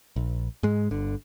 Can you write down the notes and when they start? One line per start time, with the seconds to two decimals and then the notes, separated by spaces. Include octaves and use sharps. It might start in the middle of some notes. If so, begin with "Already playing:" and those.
0.16 A#1
0.63 G#2 G#3
0.91 G1 D3